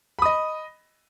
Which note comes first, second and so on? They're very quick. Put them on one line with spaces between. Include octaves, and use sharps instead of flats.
B5 D#6 D#5